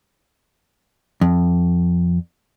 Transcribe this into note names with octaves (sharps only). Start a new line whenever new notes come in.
F2